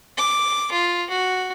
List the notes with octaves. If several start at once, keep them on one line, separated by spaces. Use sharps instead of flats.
D6
F4
F#4